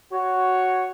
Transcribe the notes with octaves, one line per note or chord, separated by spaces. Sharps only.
F#4 C#5